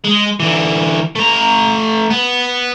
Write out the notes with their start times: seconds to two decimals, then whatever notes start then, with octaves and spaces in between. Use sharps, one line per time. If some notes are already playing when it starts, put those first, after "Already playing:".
0.04 G#3
0.40 D3 E3
1.15 A3 A#5
2.11 B3